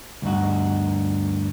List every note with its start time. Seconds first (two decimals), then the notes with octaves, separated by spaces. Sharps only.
0.22 D2 G2 D#4 F#4